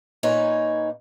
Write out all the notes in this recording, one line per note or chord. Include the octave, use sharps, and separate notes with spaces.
A#2 A#3 D#4 B4 C#5 G#5